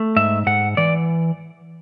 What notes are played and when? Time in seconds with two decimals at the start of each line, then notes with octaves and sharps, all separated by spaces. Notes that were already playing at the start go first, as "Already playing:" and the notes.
Already playing: A3
0.16 G#2 E5
0.47 G#2 F#5
0.77 E3 D5